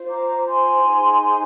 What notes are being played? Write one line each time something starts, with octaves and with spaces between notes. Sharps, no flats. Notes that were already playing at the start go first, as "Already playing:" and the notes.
Already playing: F4 C5
A#5 D6
G#5 C6
D#4 G#4 C5